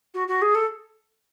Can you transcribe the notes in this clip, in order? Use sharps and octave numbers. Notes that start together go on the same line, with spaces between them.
F#4
F#4
G#4
A4